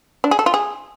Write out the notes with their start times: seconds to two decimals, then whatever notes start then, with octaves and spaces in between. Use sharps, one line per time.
0.24 D4
0.31 G#4
0.39 A4
0.46 F4
0.54 G#4